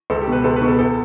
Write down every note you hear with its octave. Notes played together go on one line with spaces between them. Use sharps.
C#2 A4
G4
B2 B4
C#2 A4
B4
B2
A4
E2 A4